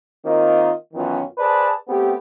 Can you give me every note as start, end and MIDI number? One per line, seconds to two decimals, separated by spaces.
0.24 0.72 51
0.24 0.72 58
0.24 0.72 60
0.24 0.72 65
0.24 0.72 75
0.94 1.23 42
0.94 1.23 51
0.94 1.23 52
0.94 1.23 59
0.94 1.23 61
0.94 1.23 65
1.39 1.74 68
1.39 1.74 71
1.39 1.74 72
1.39 1.74 74
1.39 1.74 81
1.89 2.15 57
1.89 2.15 59
1.89 2.15 60
1.89 2.15 67